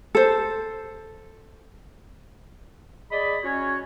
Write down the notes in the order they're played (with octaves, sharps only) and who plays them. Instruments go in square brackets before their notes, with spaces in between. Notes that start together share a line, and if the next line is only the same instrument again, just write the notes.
[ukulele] A4 C5
[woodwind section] G#4 D5 D#5 B5
C#4 F#4 C#5